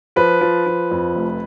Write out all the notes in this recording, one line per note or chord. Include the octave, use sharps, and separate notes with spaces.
F3 B4
F3
F3
F2
F1